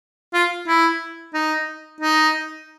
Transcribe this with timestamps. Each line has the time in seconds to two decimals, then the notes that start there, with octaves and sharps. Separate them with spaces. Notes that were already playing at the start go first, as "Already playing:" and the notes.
0.33 F4
0.68 E4
1.34 D#4
2.00 D#4